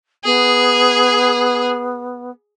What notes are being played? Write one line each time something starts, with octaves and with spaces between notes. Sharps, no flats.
B3 G#4